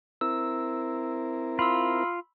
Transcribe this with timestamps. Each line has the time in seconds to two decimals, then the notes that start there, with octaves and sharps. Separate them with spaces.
0.21 C4 E4 A#4 E6
1.59 F4 B5 C6 E6